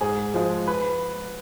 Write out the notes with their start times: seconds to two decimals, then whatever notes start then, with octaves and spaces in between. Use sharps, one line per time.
0.01 G#2 G#4
0.34 F3 G#3
0.68 B4